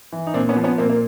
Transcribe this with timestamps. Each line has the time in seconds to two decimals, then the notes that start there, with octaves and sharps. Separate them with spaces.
0.12 E3
0.27 D#4
0.34 A#2 C4 D4
0.49 B3 C#4
0.56 F3
0.64 B3 C#4
0.78 A#2 A#3 C4
0.89 A#3